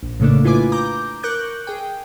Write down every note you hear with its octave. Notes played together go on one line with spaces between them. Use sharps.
A#1
A2 C#3 A3 A#3 D4
E4 F4 B4 G#5 D6
A#5 D6 G6
A#4 C#6 D6 F#6 G6
G#4 G5